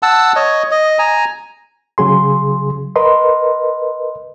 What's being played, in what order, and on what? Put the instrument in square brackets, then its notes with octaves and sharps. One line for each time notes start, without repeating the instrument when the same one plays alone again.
[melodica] F#5 A5 E6
C#5 D#5
D#5
G#5 A#5
[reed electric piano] C#3 F#3 G#4 C6
A#4 B4 D#5 C6